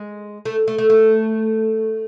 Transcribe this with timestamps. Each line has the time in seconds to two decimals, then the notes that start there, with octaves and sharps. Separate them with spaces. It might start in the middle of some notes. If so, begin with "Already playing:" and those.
Already playing: G#3
0.45 A3
0.68 A3
0.78 A3
0.90 A3